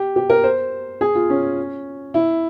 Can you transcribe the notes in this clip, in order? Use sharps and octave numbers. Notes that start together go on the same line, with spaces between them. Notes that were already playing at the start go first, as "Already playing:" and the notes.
Already playing: G4
G4
A#4
C5
G#4
F4
C#4
E4